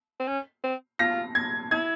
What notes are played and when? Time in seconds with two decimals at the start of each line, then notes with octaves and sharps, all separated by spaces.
0.19 C4
0.28 C#4
0.64 C4
0.99 F4 A#6
1.35 G#6
1.71 E4 G#6